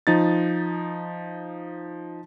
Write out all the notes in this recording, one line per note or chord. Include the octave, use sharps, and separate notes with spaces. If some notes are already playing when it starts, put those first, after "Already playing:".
F3 D#4 A6